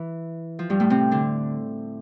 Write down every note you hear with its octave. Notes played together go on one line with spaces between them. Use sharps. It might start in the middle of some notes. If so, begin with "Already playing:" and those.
Already playing: E3
F3
G2 G3
A2 A3
C3 C4
D3 D4